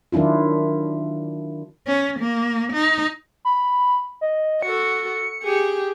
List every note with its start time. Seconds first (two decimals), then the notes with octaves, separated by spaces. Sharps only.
0.12 D#3 F#3 D4 E4 F4
1.87 C#4
2.20 A#3
2.73 D#4
3.45 B5
4.21 D#5
4.62 F#4 A4 C#7
5.42 G4 G#4